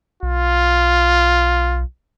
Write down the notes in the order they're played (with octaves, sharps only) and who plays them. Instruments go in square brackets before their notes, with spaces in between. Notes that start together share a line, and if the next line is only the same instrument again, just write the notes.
[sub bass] B1 [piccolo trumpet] F4